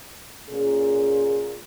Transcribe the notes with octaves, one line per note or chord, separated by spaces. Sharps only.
A#2 C#4 G#4